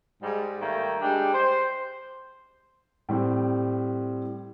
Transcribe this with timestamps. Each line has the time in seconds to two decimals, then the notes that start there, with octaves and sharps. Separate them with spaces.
0.22 G#2 G3
0.61 D#3 G3 A3 A#3 G5
1.01 G3 G#3 D4 G4 G5
1.33 C5
3.09 A2 G3 C4